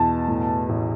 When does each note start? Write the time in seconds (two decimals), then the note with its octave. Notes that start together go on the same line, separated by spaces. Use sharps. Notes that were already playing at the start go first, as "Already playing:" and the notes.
Already playing: E2 B2 A5
0.28 A2
0.69 A1